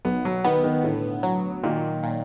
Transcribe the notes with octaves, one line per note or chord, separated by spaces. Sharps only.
B1 B3
F#3
D#3 B3
D#3
A2 D3
F#3
A#2 D#3
A#2